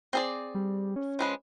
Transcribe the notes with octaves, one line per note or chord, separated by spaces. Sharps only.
C4 G#4 D5
G3
C#4
F3 G#3 B4